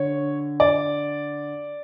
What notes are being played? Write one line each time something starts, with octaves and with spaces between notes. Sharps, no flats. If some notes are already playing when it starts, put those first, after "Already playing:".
Already playing: D3 C#5
D5